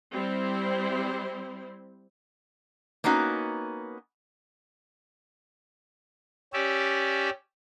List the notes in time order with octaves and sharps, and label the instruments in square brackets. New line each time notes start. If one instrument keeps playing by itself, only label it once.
[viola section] G3 C4 E4 C5
[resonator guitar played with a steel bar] A#3 B3 C#4 D#4 F#4
[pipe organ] C#4 G4 D5 E5